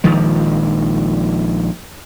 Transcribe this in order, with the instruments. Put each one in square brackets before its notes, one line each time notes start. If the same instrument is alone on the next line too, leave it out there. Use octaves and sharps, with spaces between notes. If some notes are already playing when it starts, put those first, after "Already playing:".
[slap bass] A#1 D#3 F3 G#3